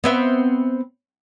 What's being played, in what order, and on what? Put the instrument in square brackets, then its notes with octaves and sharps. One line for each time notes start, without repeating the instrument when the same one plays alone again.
[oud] B3 C4 E5